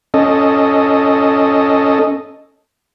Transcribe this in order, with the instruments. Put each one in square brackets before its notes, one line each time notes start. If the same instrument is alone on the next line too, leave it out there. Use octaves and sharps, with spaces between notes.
[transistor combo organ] C#4 A4 D#5